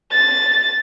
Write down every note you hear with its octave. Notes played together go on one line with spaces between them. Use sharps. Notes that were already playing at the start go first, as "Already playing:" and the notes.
A6